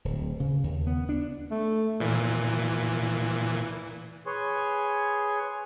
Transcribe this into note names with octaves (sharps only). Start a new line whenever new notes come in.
D1
C#3
D#2
B3
D4
A3
A#2 E3
G#4 B4 C#5 G#5 C6 C#6